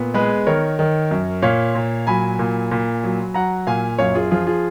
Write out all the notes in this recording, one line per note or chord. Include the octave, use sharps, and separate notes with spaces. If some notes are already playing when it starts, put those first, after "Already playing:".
Already playing: A#2 B3
G#3 G#4 B4
D#3 A#4 C#5
D#3
F#2
A#2 C#5 F5
A#2
F#3 G#5 B5
A#2
A#2
F#3
F#3 F#5 A#5
A#2 F5 G#5
F#2 C#5 F5
F4 G#4
F3 F4 G#4
F4 G#4